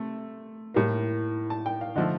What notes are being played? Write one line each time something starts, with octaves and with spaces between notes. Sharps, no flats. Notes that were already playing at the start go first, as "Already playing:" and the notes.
Already playing: C3 A3
A2 G3 A#3
A5
G5
F5
D3 F3 A3 D#5